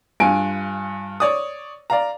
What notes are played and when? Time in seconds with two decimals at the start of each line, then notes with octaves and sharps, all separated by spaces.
0.20 G2 F4 G#5 D7
1.20 C#5 D5 D#6
1.90 D5 F5 A#5